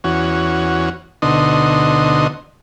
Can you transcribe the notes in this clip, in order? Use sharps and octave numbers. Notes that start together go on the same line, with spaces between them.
E2 C#4 F#4
D2 B2 D3 D#4 D#5 C6